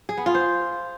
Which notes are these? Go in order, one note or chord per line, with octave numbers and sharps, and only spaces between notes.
G#4
B3
F4
C5